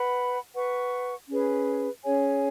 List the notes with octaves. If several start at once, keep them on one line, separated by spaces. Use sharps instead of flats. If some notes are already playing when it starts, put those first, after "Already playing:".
Already playing: B4 F#5 B5
B4 F#5 C#6
C#4 G#4 B4
C#4 G#4 C#5 G#5